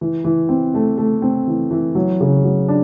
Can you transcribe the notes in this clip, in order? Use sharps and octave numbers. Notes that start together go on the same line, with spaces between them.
E3
E3
C4
A3
A3
C4
E3
E3
F#3
C#3
F#3
D4